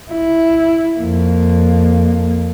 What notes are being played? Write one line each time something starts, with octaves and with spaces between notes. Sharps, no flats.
E4
F2 A#3